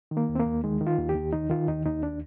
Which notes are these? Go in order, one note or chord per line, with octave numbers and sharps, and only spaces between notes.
D#3
A#3
D#2
C4
A#3
D#2
D#3 G#3
D#3
F4
D#2
G4
D#2
D#3 D#4
D#3 F4
D#2 D#4
D#2 D#4
D4